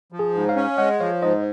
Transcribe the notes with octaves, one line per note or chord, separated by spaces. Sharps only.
F3
G#4
G#2
C#5 F5
C#4
G#3 D#5 F#5
F3 C#5 F5
G#2 C5 D#5